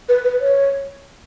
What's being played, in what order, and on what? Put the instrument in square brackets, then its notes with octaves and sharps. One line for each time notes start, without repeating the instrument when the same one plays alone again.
[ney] B4
B4
C#5